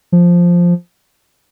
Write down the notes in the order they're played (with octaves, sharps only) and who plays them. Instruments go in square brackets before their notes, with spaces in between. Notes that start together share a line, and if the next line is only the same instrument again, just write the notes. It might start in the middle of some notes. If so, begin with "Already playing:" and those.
[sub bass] F3